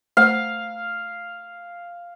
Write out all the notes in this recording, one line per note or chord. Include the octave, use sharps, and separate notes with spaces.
A3 C5 F5 F#5